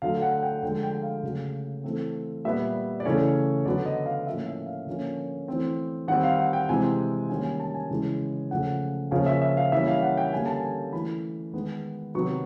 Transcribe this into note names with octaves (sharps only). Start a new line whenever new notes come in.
D3 F#3 A3 F5
F#5
G5
D3 F3 G#3 G5
G5
F5
C#3 F#3 A3
E3 A3 C4
A#2 G3 B3 E5
D5
C#3 E3 A3 C#4 C#5
D3 F#3 B3 D5
D#5
F5
A2 F3 A#3 C#4 E5
E5
F5
D3 F3 A#3 C#4
E3 A3 C4
D#3 G3 C4 F#5
F5
F#5
G5
C3 E3 G#3 C4 G#5
D#3 G3 A#3 C#4 G#5
G#5
A5
G#5
C#3 E3 G#3 C#4
C#3 F3 A3 C#4 F#5
C#3 F3 A#3 C#4 F5
E5
E5
F5
E3 G3 A#3 C#4 E5
F5
F#5
G5
D3 G3 A#3 C#4 G#5
A5
G#5
E3 A3 C#4 B5
D#3 G#3 B3
C3 D#3 F#3 B3 C#6